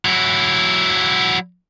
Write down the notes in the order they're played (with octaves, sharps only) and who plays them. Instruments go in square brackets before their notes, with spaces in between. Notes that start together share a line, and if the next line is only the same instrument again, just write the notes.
[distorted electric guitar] F#3 E4